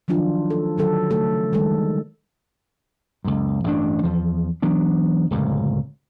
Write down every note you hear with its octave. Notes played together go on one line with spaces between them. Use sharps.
D#3 F3 F#3 D4 F4
A4
D3 D#3 F#3 A4
C#3 A3 A4
D#3 G3 G#3 A4
C#2 F#2
A1 G2 D4
E2 F3
E3 F#3 B3 D4
D1 C#2 F#2